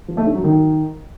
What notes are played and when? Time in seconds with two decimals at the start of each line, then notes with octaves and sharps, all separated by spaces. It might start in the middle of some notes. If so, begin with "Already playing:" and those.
0.08 F3
0.17 A3
0.26 D4
0.35 F#3
0.44 D#3